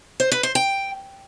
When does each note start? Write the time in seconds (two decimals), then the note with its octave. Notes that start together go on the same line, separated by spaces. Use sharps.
0.20 C5
0.32 B4
0.43 C5
0.55 G5